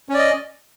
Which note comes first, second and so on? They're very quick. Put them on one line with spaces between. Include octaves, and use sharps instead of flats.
C#4 D5 D#5